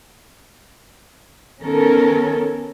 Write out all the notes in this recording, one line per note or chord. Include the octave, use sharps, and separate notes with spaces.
D#3 B3 C#4 A4 A#4